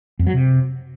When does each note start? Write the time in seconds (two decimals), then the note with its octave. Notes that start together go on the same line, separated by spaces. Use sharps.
0.19 F2
0.27 F#3
0.34 C3